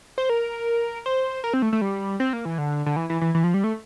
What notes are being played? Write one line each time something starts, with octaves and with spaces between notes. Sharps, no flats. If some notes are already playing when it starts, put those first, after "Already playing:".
C5
A#4
C5
A#4
C4
A3
A3
G3
C4
A#3
E3
D3
D3
E3
E3
E3
E3
F3
G3
A3